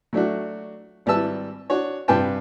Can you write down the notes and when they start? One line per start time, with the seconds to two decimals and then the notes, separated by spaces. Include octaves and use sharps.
0.13 F#3 A3 D4 F#4
1.06 G#1 G3 E4 B4 A5 E6
1.70 D4 F#4 C#5
2.08 G2 C3 B4 G5 A5